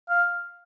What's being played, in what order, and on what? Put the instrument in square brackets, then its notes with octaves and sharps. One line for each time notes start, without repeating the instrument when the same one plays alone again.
[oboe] F5